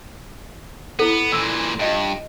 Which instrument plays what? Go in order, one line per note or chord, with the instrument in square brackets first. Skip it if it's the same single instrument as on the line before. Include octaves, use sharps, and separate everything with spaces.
[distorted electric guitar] B3 [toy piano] E4 A4
[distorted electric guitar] A#2 E3 [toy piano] E6
[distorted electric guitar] G2 [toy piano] F4 D#5 B5